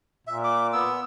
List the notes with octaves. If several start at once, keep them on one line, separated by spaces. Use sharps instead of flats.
A#2 E5
D6
B3 E6